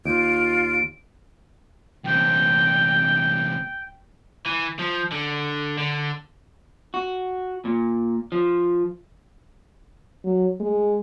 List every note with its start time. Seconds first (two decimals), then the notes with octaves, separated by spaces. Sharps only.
0.05 D#2 F4 D7
2.04 E2 C3 G5
4.46 E3
4.79 F3
5.12 D3
5.78 D3
6.94 F#4
7.65 A#2
8.32 F3
10.25 F#3
10.60 G#3